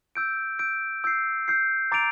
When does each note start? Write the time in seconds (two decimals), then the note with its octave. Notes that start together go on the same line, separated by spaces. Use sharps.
0.15 E6 G6 D7
0.59 E6 G6 D7
1.04 E6 G6 C7
1.48 E6 G6 C7
1.92 A#5 D6 A6 D7 F7